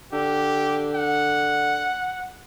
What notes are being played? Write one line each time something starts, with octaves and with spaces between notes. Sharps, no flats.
D3 G4
F#5